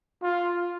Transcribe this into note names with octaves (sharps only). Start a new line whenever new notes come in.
F4